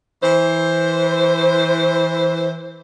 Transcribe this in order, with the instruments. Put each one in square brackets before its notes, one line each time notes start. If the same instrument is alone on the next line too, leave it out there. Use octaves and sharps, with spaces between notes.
[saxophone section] E3 C5